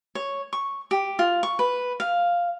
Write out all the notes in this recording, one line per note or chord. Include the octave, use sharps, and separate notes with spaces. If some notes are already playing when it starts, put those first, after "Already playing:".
C#5
C#6
G4
F4
C#6
B4
F5